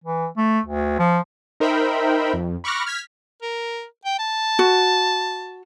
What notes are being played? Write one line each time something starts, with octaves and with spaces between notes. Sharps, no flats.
E3
A3
D2
F3
D#4 A#4 C5 E5 G5 B5
F2
B5 C#6 D6 F6 F#6 A#6
F6 G#6 B6
A#4
G5
A5
F#4